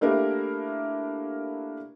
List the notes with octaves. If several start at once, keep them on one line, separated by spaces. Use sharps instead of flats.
A3 A#3 D4 E4 G4 A#4